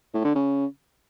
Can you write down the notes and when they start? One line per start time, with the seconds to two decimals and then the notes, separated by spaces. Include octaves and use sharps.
0.14 A2
0.25 D3
0.35 C#3